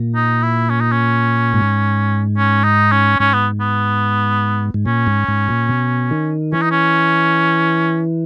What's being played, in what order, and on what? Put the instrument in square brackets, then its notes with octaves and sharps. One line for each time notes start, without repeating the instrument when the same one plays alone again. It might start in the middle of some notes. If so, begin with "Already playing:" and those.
Already playing: [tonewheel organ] A#2
[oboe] D#4
E4
C#4
D#4
C#4
[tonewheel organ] G#2
[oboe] C#4
D#4
C#4
[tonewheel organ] G#2 [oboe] C#4
[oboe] B3
B3
[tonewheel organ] G#2
[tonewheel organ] A#2 [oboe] C#4
[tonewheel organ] G#2
G#2
A#2
B2
D#3
[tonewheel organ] E3 [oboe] C#4
[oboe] D#4
C#4